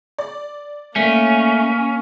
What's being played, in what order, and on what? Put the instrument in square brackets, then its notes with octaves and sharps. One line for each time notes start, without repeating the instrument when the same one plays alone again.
[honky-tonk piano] D5
[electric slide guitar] A3 [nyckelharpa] A#3 [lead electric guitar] C#4